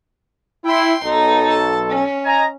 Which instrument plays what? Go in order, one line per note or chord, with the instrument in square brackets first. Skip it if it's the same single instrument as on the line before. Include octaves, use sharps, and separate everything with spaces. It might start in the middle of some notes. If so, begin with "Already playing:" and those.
[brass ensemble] E4 [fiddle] G5 C6
[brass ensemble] B1 A4 [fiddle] D#4
[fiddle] A5
C#4
[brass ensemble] D#5 G#5 A#5